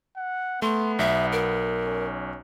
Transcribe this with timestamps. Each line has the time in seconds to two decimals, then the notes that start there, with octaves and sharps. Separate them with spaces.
0.16 F#5
0.62 A3 B3 C6
0.99 B1 E5
1.32 A#4
1.85 C#4